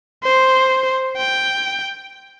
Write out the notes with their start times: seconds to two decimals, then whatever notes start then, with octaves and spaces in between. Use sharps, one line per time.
0.23 C5
1.17 G5